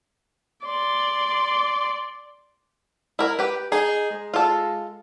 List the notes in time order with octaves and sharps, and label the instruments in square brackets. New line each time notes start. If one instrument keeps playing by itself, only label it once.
[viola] D5 C6
[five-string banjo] E4 A#4
G4 B4
[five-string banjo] D#4 [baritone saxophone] G#4
[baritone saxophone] G#3
[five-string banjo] F4 A4